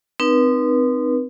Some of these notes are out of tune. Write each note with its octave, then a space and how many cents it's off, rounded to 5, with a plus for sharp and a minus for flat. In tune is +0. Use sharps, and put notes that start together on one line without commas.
C4 -25 D#4 -25 B4 -35